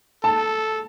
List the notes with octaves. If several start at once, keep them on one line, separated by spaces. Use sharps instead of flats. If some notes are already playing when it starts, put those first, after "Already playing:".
A4 A5